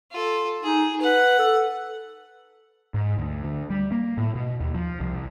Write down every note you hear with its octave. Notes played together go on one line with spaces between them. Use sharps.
F4 A4
D#4 G#4
B4 F#5
A4
G#2
D2
D2
G3
A#3
A2
B2
D#2
F3
C2